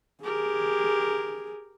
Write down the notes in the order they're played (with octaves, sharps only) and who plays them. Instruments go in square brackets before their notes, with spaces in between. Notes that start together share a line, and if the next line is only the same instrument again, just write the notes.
[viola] G4 A#4 [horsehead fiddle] G#4